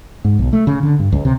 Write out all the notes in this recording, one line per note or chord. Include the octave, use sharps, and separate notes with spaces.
G#2
B1
A3
C#3
D3
G2
C#2
C3